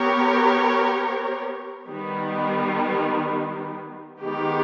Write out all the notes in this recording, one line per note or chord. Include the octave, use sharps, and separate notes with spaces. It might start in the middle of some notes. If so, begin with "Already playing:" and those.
Already playing: B3 G4 A#4 C#5
D#3 G3 B3
D#3 G#3 B3 G4